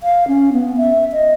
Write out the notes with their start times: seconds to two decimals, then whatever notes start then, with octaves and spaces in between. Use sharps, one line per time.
0.03 F5
0.28 C#4
0.53 B3
0.77 E5
1.12 D#5